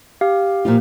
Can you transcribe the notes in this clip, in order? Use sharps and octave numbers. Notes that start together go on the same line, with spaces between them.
G4 F5
A#2 F3 F4